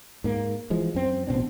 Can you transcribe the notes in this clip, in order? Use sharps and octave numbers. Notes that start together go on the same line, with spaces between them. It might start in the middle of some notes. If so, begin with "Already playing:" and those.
G#2 A#3
E3 F3 G#3
F#2 C4
A1 B2 C4 D4